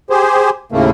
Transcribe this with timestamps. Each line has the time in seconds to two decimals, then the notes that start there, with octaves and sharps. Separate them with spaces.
0.10 G4 G#4 C5
0.72 D#2 A2 C#3 A3 A#3